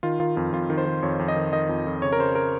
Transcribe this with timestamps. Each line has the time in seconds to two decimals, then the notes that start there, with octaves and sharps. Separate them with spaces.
0.03 D#3 F4
0.20 D#3 F4
0.36 F2 F4
0.52 F2 F4
0.70 D#3
0.78 C5
0.86 D#3
1.03 F2 C#5
1.19 F2
1.28 D#5
1.36 D#3
1.53 D#3 D#5
1.69 F2
1.87 F2
2.02 C#3 C#5
2.13 A#4
2.19 C#3 C5
2.35 A#4